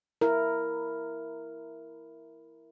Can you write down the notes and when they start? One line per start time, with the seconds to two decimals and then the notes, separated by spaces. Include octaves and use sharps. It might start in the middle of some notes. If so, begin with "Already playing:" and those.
0.21 E4 A#4